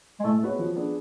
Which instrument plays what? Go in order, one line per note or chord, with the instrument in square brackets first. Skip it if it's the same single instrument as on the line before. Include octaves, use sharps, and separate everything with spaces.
[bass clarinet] G#3
[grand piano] A2 [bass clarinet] A3
[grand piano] G#3 B3 F#4 C#5
F3
B3 D4 G#4